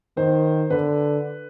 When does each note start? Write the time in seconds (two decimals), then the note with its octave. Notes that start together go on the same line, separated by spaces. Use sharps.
0.17 D#3 C5
0.70 D3 B4